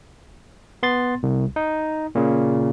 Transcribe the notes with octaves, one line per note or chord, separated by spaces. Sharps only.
B3 C6 A6
C2
D#4
A#2 C#3